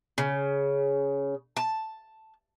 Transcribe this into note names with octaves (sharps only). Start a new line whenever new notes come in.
C#3
A5